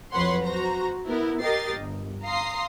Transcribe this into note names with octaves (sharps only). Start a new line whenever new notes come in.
F2 F#3 B4 C#5 F#5 C6
F#4 C5 A#5
B3 E4 A#4
G4 A#4 D#5 A6 C7
G1
F5 A#5 C6 D#6 C7